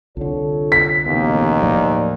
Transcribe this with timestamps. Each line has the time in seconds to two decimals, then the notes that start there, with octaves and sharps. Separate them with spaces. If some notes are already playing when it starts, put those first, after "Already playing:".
0.17 C2 D3 F4 A4 C#5
0.72 B6
1.07 A1 D#2 B2 B3
1.62 A2 F3 F#3 D5